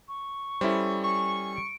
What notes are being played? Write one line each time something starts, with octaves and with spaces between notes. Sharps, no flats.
C#6
G3 C#4 E4 A4 C5
G#5 C#6
D7